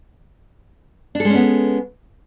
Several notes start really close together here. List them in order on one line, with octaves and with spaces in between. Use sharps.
D4 A4 G#3 C#4 B3